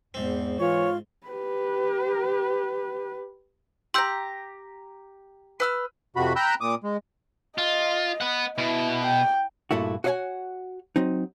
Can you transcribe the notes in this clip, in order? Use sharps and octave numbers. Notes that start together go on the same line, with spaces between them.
E2 G#2 C4
E3 F4 C#5
G4 B4
G4 A#5 C6 E6 G6
B4 E6 F6
F2 C3 F#4 B5
G5 A#5 B5 E6 F#6 G6
A#2 D6 D#6
G#3
F4 D#5
B3 F#5
B2 E4
G5
G2 A#2 A3 E4 F#4
F#4 C#5 D#5 F5 F#5 G#5
F#3 C4 D#4